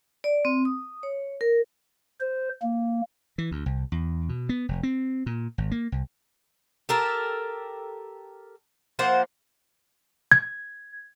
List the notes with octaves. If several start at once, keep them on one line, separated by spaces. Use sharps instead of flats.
D5
C4
D#6
C#5
A#4
C5
A#3
E3
D2
C2
E2
B2
B3
F1
C4
A#2
G#1
A#3
C2
G4 A4 A#4
F3 A#3 C5 F#5
G#6